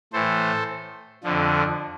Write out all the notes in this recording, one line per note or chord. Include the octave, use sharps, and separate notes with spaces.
A2 E3 A4 C5
F2 D3 F3